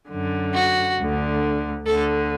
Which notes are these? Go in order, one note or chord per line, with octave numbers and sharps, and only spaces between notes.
F#2 D3
F#4
D2 D3
D2 D3 A4